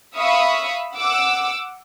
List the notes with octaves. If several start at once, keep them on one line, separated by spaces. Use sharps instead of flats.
E5 F5 B5 C#6 D#6
F#5 D6 E6